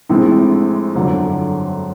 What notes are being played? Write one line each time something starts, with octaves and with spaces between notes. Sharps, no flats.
A#1 A2 E3 G#3 C4
G1 F2 D3 F#3